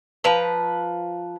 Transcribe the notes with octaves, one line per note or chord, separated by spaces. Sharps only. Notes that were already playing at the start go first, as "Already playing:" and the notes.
F3 B4 A#5